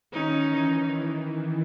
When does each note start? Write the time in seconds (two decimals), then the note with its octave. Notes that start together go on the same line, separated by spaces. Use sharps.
0.13 D#3 C#4 D#4
0.49 E3